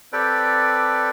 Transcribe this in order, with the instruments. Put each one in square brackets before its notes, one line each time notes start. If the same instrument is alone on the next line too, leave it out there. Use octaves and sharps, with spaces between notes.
[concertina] C4 G4 A4 B4 D5 G5